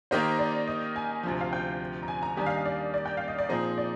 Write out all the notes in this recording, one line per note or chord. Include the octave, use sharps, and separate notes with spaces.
D#3 A#3 D#4 G4 A#4 C5
D5
D#5
G#5
D2 C3 F3
F5
G5
A#5
G#5
A#5
D#2 D#3 G3 D4 G4 G#5
F5
D#5
D5
D5
G5
F5
D#5
D5
A#2 F3 C4 D#4 G#4 C5
D5